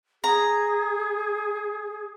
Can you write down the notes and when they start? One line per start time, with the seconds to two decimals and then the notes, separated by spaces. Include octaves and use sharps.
0.24 G#4 A#5